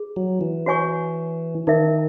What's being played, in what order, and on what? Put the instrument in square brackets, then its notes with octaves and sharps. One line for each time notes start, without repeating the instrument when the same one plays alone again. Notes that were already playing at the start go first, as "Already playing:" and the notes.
Already playing: [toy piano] G#4
[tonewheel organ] F#3
E3
[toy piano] F#4 C#5 G#5 C#6
[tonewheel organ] D#3 [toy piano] D#4 A#4 E5